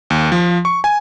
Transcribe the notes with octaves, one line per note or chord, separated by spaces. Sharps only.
D#2
F3
C#6
G#5